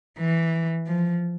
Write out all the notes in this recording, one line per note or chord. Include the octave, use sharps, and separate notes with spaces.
E3
F3